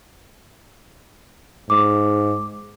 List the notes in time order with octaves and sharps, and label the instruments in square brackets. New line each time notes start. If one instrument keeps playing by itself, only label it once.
[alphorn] G#2 [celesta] D6